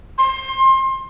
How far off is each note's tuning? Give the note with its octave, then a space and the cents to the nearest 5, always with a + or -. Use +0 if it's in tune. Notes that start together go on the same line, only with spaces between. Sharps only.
C6 +25